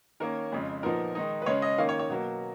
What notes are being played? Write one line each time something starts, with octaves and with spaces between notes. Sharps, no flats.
D#3 A#3 C#4 A#4
F2 C#3 G#3
A#2 F3 B3 D#4 A#4
D#3 G#3 D#4
B4
C#3 G#3 C#4 C#5
D#5
D#3 A#3 C#4 F5
C#5
C#5
B2 F#3 A#3